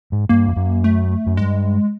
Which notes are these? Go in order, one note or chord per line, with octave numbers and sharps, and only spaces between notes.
G#2
G2 A#3
F2
F#2
A3
F#2
G2 G#3